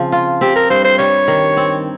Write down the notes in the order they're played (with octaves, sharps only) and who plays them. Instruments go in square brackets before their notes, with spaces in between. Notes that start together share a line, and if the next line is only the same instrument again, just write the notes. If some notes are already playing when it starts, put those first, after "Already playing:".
Already playing: [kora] C#3 F3 C4
F4
[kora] C4 [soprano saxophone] G4
[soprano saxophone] A#4
[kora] G2 [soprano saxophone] C5
[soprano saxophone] C5
[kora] G3 [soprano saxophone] C#5
[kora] D#3
C4